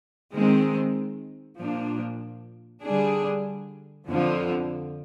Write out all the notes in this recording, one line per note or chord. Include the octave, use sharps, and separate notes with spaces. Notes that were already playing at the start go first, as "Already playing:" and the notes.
D#3 G#3 C4
A#2 F3 A#3 D4
D3 G3 D4 G#4
F2 D3 F3